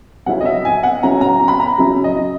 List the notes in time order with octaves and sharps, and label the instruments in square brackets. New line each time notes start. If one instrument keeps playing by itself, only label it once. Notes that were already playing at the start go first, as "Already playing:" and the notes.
[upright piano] C#3 F#3 C#4 E4 F#5
D#5
E5
G#5
F#5
C#3 F#3 C#4 E4 A#5
A#5
B5
A#5
C#3 F#3 C#4 E4
D#5